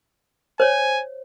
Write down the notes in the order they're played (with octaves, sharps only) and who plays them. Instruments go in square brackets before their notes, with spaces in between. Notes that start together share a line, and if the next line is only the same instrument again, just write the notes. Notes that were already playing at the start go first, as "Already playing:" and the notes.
[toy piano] C5 C#5 [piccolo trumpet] G#5